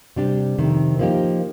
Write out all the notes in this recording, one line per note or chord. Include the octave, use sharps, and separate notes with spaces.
C3 G3 D4 G4
F2 C3 D#3
F3 A#3 D#4 G4